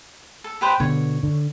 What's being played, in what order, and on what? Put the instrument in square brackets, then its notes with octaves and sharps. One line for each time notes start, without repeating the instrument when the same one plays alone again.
[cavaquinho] A4
G4 B4 C5
[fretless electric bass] B2 D3 B3 [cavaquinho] C#5
[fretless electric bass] D3